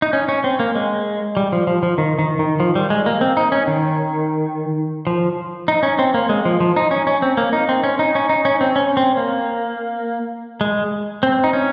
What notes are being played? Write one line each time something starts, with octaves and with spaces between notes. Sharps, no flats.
D#4
C#4
C#4
C4
A#3
G#3
G3
F3
F3
F3
D#3
D#3
D#3
F3
G3
G#3
A#3
C4
D#4
C#4
D#3
F3
D#4
C#4
C4
A#3
G#3
F3
F3
D#4
C#4
C#4
C4
A#3
D#4
C4
C#4
D#4
C#4
D#4
C#4
C4
C#4
C4
A#3
G#3
C4
D#4
C#4